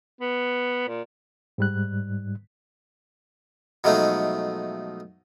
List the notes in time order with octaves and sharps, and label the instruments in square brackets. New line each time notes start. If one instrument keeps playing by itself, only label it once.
[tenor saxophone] B3
A#2
[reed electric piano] G#2 G3 F#6
[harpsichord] B2 F3 F#3 G#3 A3 D#4